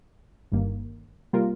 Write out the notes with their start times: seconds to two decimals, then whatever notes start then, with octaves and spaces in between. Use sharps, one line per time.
0.52 G1 G2 D#3 A#3
1.33 C3 G3 A#3 F4 A#4